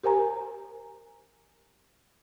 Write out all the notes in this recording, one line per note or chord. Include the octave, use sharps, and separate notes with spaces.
G4 A#4 C5 G#5 A#5